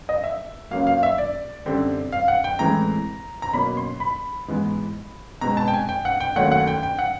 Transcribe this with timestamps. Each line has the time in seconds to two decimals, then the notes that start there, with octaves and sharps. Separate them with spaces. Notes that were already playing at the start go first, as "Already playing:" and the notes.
0.09 D#5
0.24 E5
0.71 C#2 C#3 F#3 A#3 F5
0.87 F5
1.03 E5
1.18 D5
1.66 F#2 D3 G3 C4
2.12 F5
2.28 F#5
2.44 G5
2.59 A2 E3 G#3 C4 A#5
3.42 A#5
3.53 B2 F#3 A#3 C#4 B5
3.77 C6
4.00 B5
4.48 G#2 E3 G#3 B3
5.41 B2 G#3 C4 A#5
5.57 A5
5.68 G5
5.74 G#5
5.89 G5
6.05 F#5
6.20 G5
6.36 D#2 D#3 F#3 A3 C#4 F#5
6.52 F#5
6.67 G5
6.83 G5
6.99 F#5